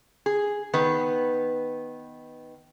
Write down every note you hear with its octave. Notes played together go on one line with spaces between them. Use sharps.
G#4
D#3 B3 B4